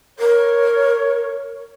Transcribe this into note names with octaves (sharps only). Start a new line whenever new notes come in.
A#4 C#5